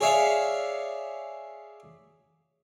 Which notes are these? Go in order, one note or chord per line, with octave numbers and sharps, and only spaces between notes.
G#4 C#5 D5 E5 F5